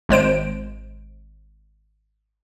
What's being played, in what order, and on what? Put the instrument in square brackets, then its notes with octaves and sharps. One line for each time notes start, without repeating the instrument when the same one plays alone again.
[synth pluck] G#1 G#3 C5 D7